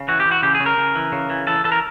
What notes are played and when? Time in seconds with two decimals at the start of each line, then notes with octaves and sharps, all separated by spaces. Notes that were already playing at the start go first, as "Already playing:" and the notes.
Already playing: C#3
0.08 E3 F#4
0.20 G4
0.26 E3
0.31 F#4
0.43 C#3 G4
0.55 G#4
0.60 C#3
0.66 A#4
0.77 C#3
0.95 E3
1.12 C#3
1.30 E3
1.47 E3 A4
1.64 E3 A4
1.72 A#4